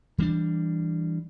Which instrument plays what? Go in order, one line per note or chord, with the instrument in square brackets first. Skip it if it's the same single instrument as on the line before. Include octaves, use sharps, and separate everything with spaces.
[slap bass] E3 G3 A#3 D4